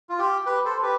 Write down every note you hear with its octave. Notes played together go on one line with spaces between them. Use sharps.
F4
G4
G4 B4
A4 C5
G4 B4